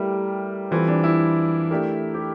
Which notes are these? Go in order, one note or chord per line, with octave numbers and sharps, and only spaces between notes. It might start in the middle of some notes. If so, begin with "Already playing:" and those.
Already playing: G3 A3 E4 G4 A#4
E3 G3 C4 F4 A4
D4
E4
A3 D4 G4 A#4
G4